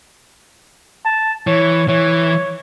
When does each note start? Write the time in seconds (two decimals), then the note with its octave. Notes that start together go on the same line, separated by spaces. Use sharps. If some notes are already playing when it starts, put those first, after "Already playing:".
1.05 A5
1.47 E3 C#5
1.89 E3 C#5